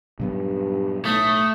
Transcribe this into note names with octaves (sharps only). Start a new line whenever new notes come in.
G2 A#2 F#3 B3
B1 A2 A3 D#6